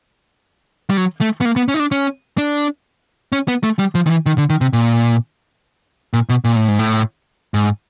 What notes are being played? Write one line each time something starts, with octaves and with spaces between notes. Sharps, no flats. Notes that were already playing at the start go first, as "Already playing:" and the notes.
G3
F#3
A3
B3
A#3
B3
C#4
D#4
D4
C#4
D4
C#4
B3
A3
G3
F3
D#3
E3
D#3
D3
D#3
C3
A#2
A#2
B2
A#2
A2
G#2
A2
G#2